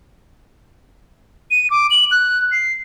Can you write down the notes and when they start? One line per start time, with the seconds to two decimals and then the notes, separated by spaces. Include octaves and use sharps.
1.51 D#7
1.70 D6
1.91 F#7
2.11 F#6
2.52 C7